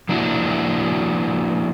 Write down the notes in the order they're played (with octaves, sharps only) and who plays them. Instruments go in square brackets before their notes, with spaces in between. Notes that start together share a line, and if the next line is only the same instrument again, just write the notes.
[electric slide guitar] F3 A#3 D4 E4 F#4